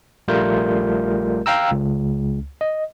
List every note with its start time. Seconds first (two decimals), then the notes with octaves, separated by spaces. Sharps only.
0.28 A#1 G3 A3 F4 A#4 G6
1.46 F5 G5 A#5 E6
1.71 C#2
2.61 D#5